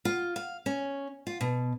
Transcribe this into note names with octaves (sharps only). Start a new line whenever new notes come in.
F4
F5
C#4
F4
B2